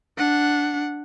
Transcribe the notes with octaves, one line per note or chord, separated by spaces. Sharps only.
D4 F#5